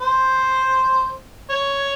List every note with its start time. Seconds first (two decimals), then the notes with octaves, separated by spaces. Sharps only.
0.01 C5
1.50 C#5